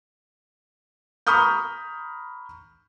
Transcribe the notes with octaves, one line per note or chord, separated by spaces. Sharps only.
A#5 B5 C#6 D#6 F6 G6